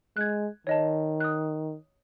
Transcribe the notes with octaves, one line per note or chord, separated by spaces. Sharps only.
G#3 F#6 G#6
D#3 C#5 D#5 A5
D#6 F#6